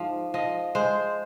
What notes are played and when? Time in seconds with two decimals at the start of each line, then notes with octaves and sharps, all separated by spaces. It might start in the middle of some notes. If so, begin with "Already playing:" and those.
Already playing: G#2 F3
0.34 F3 D#5
0.75 G#3 C5